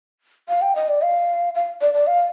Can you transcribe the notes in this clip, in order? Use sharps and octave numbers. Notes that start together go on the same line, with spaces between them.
F5
G5
D#5
D5
F5
F5
D5
D5
F5